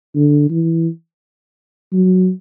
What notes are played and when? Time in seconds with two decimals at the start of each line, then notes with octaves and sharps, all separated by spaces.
0.15 D3
0.50 E3
1.92 F#3